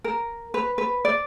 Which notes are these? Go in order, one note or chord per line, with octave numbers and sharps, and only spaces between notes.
A#4
B4
B4
D5